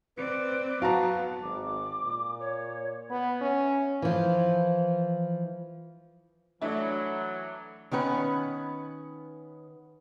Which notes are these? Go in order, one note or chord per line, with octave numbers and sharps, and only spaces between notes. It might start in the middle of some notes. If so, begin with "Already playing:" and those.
C4 B4 D5
F#3 B3 F#4 F5 A5 A#5
G#1 D6
A#2
C#5
B3 B5
C#4 E5
E3 F3
E3 F#3 A3 D4 E4
D#3 B3 C#4 B4